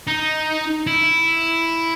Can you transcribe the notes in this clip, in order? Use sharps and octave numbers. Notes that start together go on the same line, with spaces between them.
D#4
E4